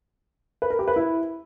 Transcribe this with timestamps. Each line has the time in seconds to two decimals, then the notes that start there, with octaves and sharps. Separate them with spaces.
0.62 B4
0.70 A#4
0.79 G4
0.88 B4
0.96 E4